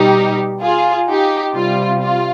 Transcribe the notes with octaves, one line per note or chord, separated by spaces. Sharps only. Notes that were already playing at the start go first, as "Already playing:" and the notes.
Already playing: B2 G3 D#4 G4
F4 G#4
D#4 G4
C3 G3 F4
F4